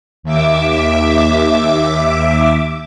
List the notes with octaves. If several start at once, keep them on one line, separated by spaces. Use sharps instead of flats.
D#2 E5 D6